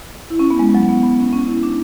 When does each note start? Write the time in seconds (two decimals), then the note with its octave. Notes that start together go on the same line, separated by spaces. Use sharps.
0.30 E4
0.39 C#4
0.50 B3
0.59 G#3
0.75 F#3
0.89 B3
1.03 B3
1.19 C#4
1.33 C#4
1.48 E4
1.63 D4